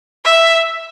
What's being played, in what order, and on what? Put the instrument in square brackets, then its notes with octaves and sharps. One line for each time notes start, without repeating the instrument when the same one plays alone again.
[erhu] E5